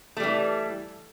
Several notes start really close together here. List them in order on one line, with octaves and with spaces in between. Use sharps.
A3 G3 E3